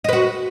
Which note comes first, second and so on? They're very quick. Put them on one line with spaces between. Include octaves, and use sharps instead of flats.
D#5 B4 F#4